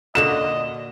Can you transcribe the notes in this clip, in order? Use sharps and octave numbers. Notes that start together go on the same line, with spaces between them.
A#2 D3 F#4 D#5 E7